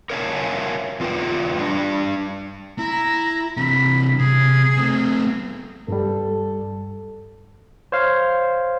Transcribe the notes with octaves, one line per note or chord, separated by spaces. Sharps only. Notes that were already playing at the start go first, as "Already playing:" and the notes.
A#4 C#5 E5 F5 G#5 A5
E2 F4 B4 G5
G3 D4
E4 A#5
C3 E3 B5
C3 G#4
A3 C4
G2 G3 A4
C5 C#5 F5